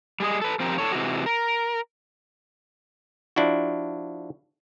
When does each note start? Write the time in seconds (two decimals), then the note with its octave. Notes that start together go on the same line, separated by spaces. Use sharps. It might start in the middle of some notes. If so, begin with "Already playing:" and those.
0.20 G3 G#4 D#5
0.42 A4 B4
0.60 F3 C4 G4 A#4
0.78 D3 A4 C#5
0.92 C3 E3 G#3 F#4
1.26 A#4
3.36 F3 D4 E4 F#4